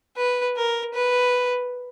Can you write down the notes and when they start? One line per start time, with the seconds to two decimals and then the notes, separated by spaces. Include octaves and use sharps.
0.17 B4
0.56 A#4
0.94 B4